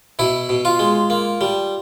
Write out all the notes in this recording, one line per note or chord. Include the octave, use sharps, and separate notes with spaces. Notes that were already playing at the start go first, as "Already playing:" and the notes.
B2 E4
B2
F4
G#3
A#3
G3